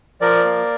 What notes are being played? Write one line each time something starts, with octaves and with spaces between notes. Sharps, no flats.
F3 A#4 D5
A#3